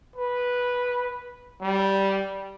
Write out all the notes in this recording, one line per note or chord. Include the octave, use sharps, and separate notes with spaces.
B4
G3